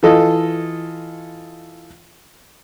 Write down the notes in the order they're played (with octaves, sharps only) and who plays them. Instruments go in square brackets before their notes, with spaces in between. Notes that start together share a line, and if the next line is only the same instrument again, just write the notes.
[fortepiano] E3 F4 A4 D#5